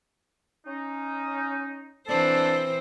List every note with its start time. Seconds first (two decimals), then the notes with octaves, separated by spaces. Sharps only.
0.66 C#4 D#4
2.07 E3 C4 D4 A4 C5